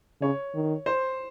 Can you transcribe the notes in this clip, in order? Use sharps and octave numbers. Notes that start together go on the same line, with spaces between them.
C#3 C#5
D#3
C5